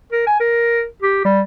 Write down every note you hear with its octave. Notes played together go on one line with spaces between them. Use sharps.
A#4
G#5
A#4
G4
G3